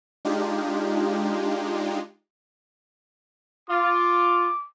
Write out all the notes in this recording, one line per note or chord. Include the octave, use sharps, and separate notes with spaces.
G#3 D4 D#4 F4 G4
F4 D6